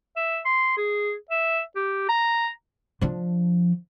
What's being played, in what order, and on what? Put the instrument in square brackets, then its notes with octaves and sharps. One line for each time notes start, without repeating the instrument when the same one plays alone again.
[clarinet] E5
C6
G#4
E5
G4
A#5
[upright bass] F3 D4